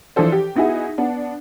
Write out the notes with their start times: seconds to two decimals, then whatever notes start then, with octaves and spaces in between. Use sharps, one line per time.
0.16 E3 F3 D4 A4 C5
0.32 G4
0.55 B3 D#4 E4 F#4 G#4
0.98 B3 D4